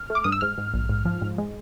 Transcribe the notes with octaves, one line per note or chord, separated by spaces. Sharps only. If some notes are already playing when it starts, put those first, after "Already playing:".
Already playing: F6
A3
D6
G2 D#6
E6
G#2 F6
G#2
A#1
G#2
F3
G#2
G#3